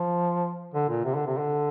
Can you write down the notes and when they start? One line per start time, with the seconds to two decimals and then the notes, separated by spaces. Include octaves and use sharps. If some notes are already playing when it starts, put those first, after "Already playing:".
Already playing: F3
0.74 D3
0.89 A#2
1.04 C3
1.15 D3
1.26 C3
1.38 D3